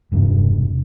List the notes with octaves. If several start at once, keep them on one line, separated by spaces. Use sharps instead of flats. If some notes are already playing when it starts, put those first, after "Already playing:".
E1 G2 C3